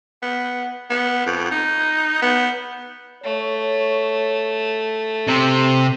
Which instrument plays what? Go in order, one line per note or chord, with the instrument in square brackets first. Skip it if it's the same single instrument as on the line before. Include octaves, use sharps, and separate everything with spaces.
[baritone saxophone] B3
B3
F2
D#4
B3
[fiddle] A3 [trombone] C#5
[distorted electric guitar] C3 [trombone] C4